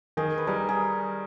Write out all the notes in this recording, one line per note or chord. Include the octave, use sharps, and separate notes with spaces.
D#3 G#4
B4
G3 A#4
G#4